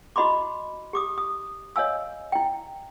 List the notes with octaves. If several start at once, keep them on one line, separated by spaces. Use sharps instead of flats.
E4 F#4 D#5 B5 C6 D6
G4 D6 D#6
D#6
C#5 D#5 F5 G#5 E6
E4 G5